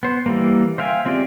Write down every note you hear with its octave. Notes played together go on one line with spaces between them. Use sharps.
B3 C5
E3 G3 A#3
C5 E5 F5 G5 G#5
G#3 C4 F4 G4 D5